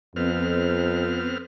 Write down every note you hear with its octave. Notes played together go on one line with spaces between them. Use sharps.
F2 B3 C4 F6